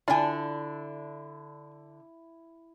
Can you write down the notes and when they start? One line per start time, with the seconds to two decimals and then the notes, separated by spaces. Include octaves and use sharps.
0.08 D3 D4 E4 F4 G#5